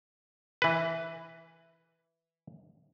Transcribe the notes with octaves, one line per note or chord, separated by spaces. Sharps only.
E3 B4